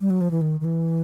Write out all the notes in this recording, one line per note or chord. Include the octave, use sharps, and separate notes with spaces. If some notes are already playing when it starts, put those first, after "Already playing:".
G3
F#3
F3
E3
D#3
D#3
E3